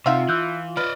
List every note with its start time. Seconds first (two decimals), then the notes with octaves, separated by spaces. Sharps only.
0.06 C3 D#4 F4 E5 F#5 E6
0.29 E3 E6 F#6 G6
0.77 B4 D5 D#5 F6